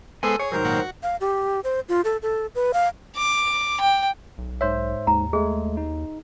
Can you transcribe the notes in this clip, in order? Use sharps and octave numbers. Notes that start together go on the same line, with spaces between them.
G#3 B3 A4 C5 G#5
G#4 C#5
G#2 D#3 F#3 A#4 C5
A#2 F#4
F#4
F5
G4
C5
F4
A4
A4
B4
F5
D6
G5
B1
G#2 C5 C#5 E5
D#2 G#2 A#5
G#3 A3 G#4
D#4